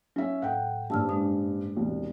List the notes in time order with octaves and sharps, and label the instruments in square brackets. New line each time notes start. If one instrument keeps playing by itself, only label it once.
[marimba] F#3 [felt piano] C#4 E5
[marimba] A2 [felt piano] F#5 G5
[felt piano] F#1 G2 [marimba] A5 E6 F6
[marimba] G#3 D4 D#6
[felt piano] E1 C2